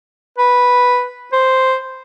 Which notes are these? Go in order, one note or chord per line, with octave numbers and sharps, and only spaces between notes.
B4
C5